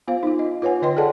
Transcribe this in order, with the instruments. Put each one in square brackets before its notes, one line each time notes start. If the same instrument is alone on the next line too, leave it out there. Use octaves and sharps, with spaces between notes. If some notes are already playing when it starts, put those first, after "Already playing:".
[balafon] B3 F4 C5 F5
D#4 F4
D#5
F4 B4 C#5 F#5 G#5
D3 B4 C#5 D#5 G5 C6
G#4 A4 D5 D#5 F#5 A5